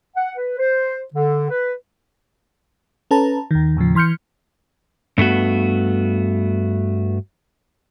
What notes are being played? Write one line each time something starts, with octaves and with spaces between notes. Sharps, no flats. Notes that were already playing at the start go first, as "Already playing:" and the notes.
F#5
B4
C5
D3
B4
C#4 A4 B4 A5 A#5
D#2 D#3
D#2 A2 C#3 F3
E3 C6 F6 G6 C#7
G2 A3 B3 F#4